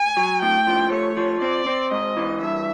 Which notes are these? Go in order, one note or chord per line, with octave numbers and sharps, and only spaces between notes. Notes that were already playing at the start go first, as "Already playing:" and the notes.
Already playing: G#5
F#3
A2 G5
F3
A3 C#5
F3
C4 D5
C4
G#2 D#5
E3
G2 E5